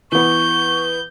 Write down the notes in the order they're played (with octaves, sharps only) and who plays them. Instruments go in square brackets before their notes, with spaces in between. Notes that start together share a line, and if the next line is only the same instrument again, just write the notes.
[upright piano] E3 B3 [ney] C#6 [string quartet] G6